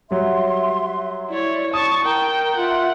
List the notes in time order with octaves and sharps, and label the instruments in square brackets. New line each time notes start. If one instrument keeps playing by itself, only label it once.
[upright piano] F#3 G3 [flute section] E5 C6
[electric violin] E4 C#5 [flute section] D5
[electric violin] A5 C#6 [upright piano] D#6
[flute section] A#4 A#5 [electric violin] G5
[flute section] F4 E5 C6 [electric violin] F#5